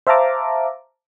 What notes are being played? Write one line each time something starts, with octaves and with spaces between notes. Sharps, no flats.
C5 E5 F5 A5 A#5 D6